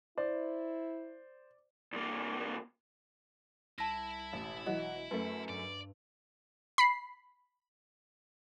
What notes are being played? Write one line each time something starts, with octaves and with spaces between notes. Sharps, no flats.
E4 C5 D5
C2 A#3
C2 E4 E5 A5 A#6
E1 A1
E3 F#3 F#4 D#5
F#2 A3 B4
G2 D5
B5 C7